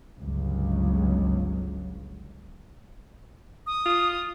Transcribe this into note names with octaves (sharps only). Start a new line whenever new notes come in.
G1 C#2 F#3
D#6
F4